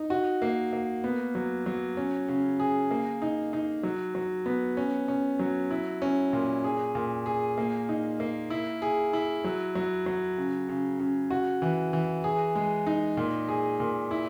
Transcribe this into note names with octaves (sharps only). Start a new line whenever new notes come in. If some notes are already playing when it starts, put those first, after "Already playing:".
Already playing: D#4
F#4
A#3
A#3
B3
F#3
F#3
C#4
C#3
G#4
A#3
D#4
D#4
F#3
F#3
B3
C#4
C#4
F#3
E4
C#4
A#2
G#4
A#2
G#4
A#3
D#4
A#3
E4
G#4
E4
F#3
F#3
F#3
C#3
C#3
C#3
F#4
E3
E3
G#4
G#3
D#4
A#2
G#4
A#2
E4